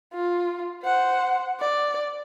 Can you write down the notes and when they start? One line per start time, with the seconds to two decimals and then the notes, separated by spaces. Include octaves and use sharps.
0.13 F4
0.83 C5 F#5
1.60 D5